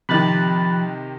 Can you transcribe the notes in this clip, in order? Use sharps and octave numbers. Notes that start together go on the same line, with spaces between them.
C3 D#3 F3 B5 F#6 A6